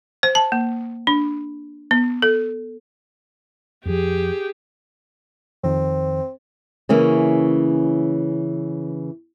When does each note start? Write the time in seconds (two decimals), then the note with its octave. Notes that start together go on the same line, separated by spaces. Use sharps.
0.23 C5
0.35 A5
0.52 A#3
1.07 D4
1.91 B3
2.22 A4
3.86 F2 F3 G4 G#4
5.64 F2 D#3 C4
6.89 C#3 E3 A#3 C#4